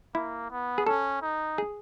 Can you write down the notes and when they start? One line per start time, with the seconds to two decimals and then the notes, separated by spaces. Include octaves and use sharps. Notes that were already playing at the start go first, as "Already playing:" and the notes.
0.15 A#3 E4
0.51 B3
0.78 G#4
0.86 C#4 A4
1.22 D#4
1.58 G#4